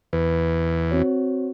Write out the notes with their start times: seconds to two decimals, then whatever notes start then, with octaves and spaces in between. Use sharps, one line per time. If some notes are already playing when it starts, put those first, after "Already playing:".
0.13 E2 B4
0.91 C4 F#4 C#5